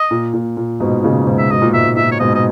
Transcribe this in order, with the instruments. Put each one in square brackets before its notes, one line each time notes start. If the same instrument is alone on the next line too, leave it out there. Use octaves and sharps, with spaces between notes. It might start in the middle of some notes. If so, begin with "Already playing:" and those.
Already playing: [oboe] D#5
[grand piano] A#2
A#2
A#2
G#2 B2
A#2 C#3
G#2 B2
[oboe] E5
[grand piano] G#2 B2 [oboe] D#5
[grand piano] A#2
[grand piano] G#2 [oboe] E5
[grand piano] A#2 [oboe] E5
[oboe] C#5
[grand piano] G#2 B2 [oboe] D#5
[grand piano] B2 [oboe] D#5